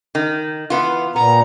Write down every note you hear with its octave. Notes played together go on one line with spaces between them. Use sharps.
D#3
E3 B3 F4
A#2 B3 A#5